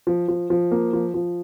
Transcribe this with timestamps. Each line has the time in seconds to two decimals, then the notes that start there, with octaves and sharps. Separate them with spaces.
0.07 F3
0.28 F3
0.50 F3
0.71 A#3
0.93 F3
1.14 F3